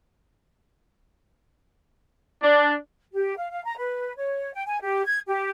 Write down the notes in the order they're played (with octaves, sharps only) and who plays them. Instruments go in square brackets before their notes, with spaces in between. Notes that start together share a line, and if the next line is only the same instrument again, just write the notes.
[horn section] D4
[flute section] G4
F5
F5
A#5
B4
C#5
G5
G#5
G4
G#6
G4